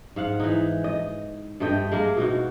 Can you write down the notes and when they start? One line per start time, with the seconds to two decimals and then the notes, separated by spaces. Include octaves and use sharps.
0.16 G#2 F5 F#5
0.40 E3 D#4
0.84 D#5
1.60 G2 A3 D#5 G5
1.92 G#3 A#3 A#4
2.17 B2 G#3 D#4 F#4